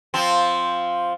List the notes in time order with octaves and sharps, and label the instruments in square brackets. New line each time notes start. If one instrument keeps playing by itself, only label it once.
[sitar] F3 C4